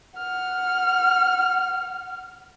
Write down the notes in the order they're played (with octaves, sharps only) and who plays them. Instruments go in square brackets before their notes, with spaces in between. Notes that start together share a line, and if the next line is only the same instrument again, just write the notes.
[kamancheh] F#5 F6